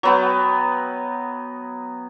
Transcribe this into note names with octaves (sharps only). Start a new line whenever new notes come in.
F#3 B3 G5